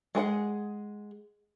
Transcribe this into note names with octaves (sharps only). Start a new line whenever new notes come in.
G#3 G#4 B4 F#5